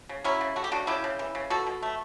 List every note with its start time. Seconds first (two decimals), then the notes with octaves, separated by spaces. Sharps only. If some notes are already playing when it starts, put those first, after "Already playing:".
0.09 C#3
0.24 F#3 C#4 E4
0.41 C#3
0.56 A3 F#4
0.64 G4
0.72 C#3 D4 F#4
0.87 C#3 E4 G4
1.04 C#3
1.19 E3
1.35 C#3
1.50 B2 F#4 A4
1.67 B2
1.82 A3